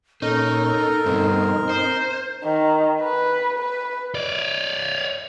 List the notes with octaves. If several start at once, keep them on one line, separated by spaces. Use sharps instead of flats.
A#2 C#4 D#4 A4 A#4
G2 B2 C4 D#4
C5
D#3
B4
B4
C#5 D5